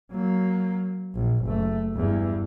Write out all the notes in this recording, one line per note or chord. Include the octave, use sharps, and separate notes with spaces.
F#3 A#3
A#1
F#1 A3
E2 G2